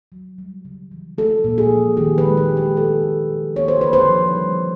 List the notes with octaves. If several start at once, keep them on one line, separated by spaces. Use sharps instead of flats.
F#3
G3
C#3
E3
A3 A4
A#2
G#4
F3
D#3 G4
B4
G#3
G4
G#3
G4
A3 A4
A#2
F3
A#3 C#5
C5
D3 B4
C5
F3
G3